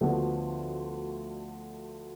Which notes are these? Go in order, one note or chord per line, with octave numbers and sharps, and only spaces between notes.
D2 D3 F3 B3 F#4